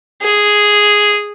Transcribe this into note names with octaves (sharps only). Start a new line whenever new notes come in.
G#4